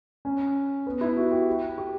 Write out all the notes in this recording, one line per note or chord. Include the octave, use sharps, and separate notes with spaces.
C#4
B3
E4
F#4
G4
G4